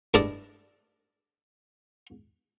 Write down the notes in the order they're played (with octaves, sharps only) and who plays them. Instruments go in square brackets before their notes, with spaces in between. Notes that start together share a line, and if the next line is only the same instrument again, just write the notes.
[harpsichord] G2 A3 E4 A4 D5 D#5